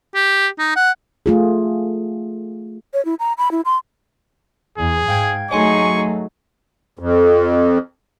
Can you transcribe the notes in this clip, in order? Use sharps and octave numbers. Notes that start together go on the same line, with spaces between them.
G4
D#4
F#5
A3 F4 G#4
C#5
E4
A#5
B5
E4
C6
E2 G#4
G#2 F5 G5 G#6
F#3 A3 D#4 G#4 C#5 G#5 C6 C#6
F2